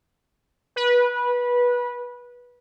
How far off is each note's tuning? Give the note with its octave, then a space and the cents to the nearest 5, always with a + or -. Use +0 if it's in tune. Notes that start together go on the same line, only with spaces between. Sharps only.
B4 -20